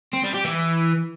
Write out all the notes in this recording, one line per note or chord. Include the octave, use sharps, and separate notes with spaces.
C4
G3
G4
E3